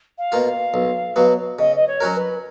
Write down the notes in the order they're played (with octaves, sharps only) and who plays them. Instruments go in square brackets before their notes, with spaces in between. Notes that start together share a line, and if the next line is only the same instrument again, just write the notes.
[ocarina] F5
[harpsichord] B2 A#3 F4
[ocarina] F5
[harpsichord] B1
B2 F#3 B3
[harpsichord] C#3 [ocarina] D#5
[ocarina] D#5
C#5
[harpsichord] F#3 C#4 F#4 A#4
[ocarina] B4